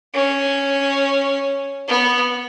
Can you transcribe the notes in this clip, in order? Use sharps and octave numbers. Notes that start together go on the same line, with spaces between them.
C#4
B3